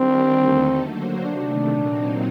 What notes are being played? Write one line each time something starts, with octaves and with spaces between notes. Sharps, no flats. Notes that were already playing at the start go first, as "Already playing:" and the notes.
Already playing: D#3 G3 C4 D4 G4 A#4
D#2 D3 A3 D#4 A4
D3 F#3 A#3 F#4 C5
C3 D#3 A3 D4
A#2 F#3 C4 D#4